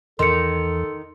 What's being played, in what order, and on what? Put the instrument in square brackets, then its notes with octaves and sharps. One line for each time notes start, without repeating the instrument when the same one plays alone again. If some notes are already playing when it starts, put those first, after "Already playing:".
[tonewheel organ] E2 [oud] D#3 [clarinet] A4 [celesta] C6 C#7